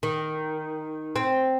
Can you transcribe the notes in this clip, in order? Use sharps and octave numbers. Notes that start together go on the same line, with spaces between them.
D#3
C4